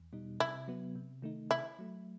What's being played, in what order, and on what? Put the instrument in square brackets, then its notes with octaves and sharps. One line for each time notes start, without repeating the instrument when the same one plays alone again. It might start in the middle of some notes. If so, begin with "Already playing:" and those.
Already playing: [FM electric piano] E2
B2 G3 D#4
[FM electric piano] C3 [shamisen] E4
[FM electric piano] F#3 B3
C3
D#3 A3 D#4
[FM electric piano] C3 [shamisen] E4
[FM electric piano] F#3 A3